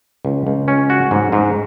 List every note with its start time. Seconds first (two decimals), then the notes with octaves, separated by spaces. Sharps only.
0.25 C#2
0.47 C#2
0.68 C#4
0.90 F#4
1.11 G#2
1.32 G#2